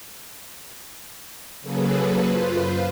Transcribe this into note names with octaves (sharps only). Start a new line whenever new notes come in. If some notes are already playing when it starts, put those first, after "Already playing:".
C#3 F#3 A#3 G#4 A4 B4
F#2 F4 B4 C5